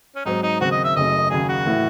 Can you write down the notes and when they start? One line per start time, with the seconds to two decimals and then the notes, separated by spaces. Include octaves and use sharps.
0.15 C#4
0.25 G#2 F#3 C4 D#4
0.43 D#4
0.61 D#2 C#3 F#3 C4 F#4
0.72 D#5
0.84 E5
0.96 F#1 F#2 C#3 F#3 A3 D#5
1.30 D#2 C#3 F#3 G#4
1.49 F#4
1.66 A2 E3